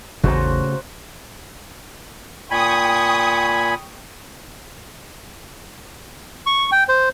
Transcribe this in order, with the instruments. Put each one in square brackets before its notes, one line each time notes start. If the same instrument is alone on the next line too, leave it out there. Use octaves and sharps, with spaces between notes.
[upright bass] A1 E2 [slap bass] C#3 A3 [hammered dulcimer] F#4 C5 A#5
[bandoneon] A#2 G#5 B5 [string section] G5 C#6 D#6
[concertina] C#6
G5
C5